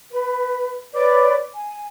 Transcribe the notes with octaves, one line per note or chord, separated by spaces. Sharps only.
B4
B4 C#5 D5 D6
G#5